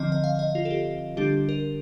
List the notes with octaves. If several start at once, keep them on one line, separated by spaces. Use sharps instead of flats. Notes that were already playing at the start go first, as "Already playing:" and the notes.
Already playing: D3 F3 C4 D#5
D#5
F5
D#5
F4
A4
G4
D3 G3 D4 G4
A#4